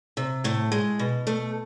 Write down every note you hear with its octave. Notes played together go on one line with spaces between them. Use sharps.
C3
A2 A3
G#3
B2
A3